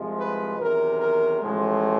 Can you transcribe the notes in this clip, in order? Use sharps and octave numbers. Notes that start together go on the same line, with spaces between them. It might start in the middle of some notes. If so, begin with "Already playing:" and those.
Already playing: C2 C3 F3 G#3
B4
E2 C3 D#3 F#3 A#4
A#4
A1 A2 F3 G#3